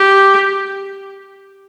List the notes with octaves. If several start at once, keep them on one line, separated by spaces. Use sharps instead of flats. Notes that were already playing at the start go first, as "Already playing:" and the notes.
Already playing: G4